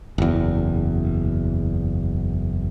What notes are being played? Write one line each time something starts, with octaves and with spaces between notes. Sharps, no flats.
F#1 E2